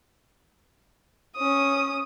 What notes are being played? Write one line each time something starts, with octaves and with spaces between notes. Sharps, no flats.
C#4 D#6